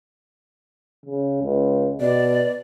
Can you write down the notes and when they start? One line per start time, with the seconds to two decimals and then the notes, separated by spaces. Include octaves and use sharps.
1.05 C#3
1.43 C#2
2.01 B2 D5